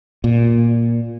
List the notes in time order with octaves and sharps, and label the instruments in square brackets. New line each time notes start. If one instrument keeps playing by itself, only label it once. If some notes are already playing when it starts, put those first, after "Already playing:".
[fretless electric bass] A#2